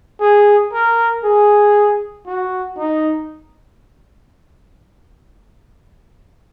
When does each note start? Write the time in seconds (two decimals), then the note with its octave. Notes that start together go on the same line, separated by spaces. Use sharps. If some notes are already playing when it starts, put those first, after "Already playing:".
0.21 G#4
0.73 A#4
1.24 G#4
2.27 F#4
2.78 D#4